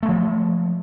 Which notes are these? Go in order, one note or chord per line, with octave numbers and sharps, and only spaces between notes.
F3 G#3 A3